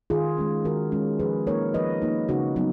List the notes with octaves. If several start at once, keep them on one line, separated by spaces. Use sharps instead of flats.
D#3 F4 G#4
G#3 C#4
D#3 F#4 A#4
G#3 C#4
F3 G#4 B4
A#3 D#4 A#4 C#5
F3 B4 D#5
A#3 D#4
C#3 D#4 F#4
F#3 B3 D#4